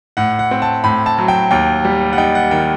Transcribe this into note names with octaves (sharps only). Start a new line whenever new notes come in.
A2 F#5
F#5
C4
A5
A2 B5
A5
F#3
G5
D#2 G5
G3
F#5
D#4 G5
F#5
D#3 G5